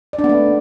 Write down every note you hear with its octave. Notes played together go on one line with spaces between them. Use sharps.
D5
D4
B3
A3